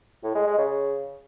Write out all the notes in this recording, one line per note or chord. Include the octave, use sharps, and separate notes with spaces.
A2
G#3
G#3
C#3